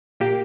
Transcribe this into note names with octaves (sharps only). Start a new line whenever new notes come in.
A#2 A#3 G4